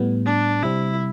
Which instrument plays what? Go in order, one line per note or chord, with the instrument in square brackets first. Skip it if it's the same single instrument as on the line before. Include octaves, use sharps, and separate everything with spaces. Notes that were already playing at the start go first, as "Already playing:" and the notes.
Already playing: [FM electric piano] A2 G3 B3
[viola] D4
[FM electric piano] C3 G3 C4 [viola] E4